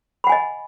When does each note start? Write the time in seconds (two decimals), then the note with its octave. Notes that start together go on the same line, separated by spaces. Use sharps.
0.24 B5
0.27 F#5
0.29 G#5
0.32 D#5